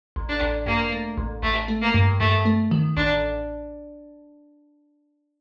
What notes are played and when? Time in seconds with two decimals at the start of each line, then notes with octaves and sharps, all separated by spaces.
0.16 A1
0.29 D4
0.42 A1
0.66 G2 A#3
0.92 A3
1.18 A1
1.43 A1 A3
1.68 A3
1.82 A#3
1.94 G2
2.20 G2 A3
2.45 A3
2.71 D#3
2.97 A1 D4